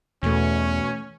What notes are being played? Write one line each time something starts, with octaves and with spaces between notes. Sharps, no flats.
E2 B2 E3 A3 C#4 C#6